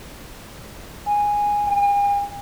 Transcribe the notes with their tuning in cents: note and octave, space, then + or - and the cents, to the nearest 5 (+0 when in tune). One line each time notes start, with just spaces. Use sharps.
G#5 -10
G#5 -45